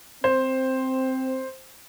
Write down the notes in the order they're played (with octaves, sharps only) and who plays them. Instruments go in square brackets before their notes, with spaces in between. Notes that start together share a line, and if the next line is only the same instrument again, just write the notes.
[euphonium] C4 [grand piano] C5